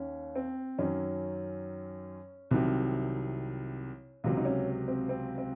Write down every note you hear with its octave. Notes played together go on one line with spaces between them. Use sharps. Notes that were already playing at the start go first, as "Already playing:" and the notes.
Already playing: D#2 D#3 C#4
C4
F#2 D#3 F#3 C#4
C2 C3 D#3 F#3
C#2 C3 F#3
D#4
C#4
C4
C4
C4